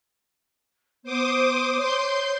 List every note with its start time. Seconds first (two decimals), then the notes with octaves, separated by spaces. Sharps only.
1.04 B3 C5 D6 D#6
1.76 C#5 C6 G6